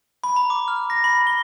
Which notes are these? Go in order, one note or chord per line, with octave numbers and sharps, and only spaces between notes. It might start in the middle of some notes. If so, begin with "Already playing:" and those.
B5
A#5
D6
F6
A#6
B5
G7